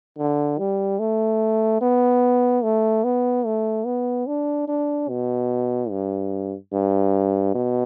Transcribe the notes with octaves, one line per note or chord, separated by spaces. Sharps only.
D3
G3
A3
B3
A3
B3
A3
B3
D4
D4
B2
G2
G2
B2